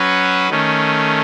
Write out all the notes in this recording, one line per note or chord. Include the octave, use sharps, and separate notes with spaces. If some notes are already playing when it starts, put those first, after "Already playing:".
Already playing: F#3 C#4 F#4 B4
D#3 A3 C#4